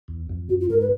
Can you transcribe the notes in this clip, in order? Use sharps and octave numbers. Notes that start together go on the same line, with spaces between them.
E2
F2
F#2 F#4
F4
G#2 A#4
B4